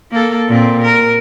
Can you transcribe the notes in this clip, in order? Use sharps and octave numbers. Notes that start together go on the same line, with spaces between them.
A#3 A4
A#2 C4
A#4